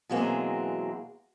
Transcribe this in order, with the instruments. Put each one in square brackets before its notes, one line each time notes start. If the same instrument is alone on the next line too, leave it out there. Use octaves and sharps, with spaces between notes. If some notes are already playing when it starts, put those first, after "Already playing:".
[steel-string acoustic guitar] B2 E3 F#3 G#3 A#3 C4